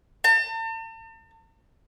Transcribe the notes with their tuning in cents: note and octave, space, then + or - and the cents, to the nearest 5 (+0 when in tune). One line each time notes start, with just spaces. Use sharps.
A5 +45